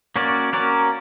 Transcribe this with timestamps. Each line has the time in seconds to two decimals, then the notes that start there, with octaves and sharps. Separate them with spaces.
0.16 A#3 C#4 F#4 A#4 D5
0.53 A#3 C#4 F#4 A#4 D5